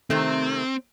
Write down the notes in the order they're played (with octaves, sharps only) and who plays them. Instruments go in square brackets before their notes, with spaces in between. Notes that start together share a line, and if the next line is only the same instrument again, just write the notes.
[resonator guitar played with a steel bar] C3 D#3 A3 [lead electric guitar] C4